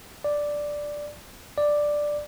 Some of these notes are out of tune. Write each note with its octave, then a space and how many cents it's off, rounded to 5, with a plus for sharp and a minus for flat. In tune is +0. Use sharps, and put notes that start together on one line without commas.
D5 +0
D5 +5